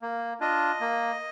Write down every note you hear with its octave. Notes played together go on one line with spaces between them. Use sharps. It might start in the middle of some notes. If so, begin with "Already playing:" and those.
A#3
D4 F4 D#5
A#3